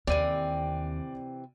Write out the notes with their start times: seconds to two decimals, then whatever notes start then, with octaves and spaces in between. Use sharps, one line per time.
0.07 D#2 C3 E3 C4 D5 D#7